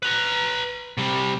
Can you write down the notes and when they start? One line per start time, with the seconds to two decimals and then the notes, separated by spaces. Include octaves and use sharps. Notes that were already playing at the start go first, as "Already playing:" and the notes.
0.03 B4 A#5
0.97 C3 G3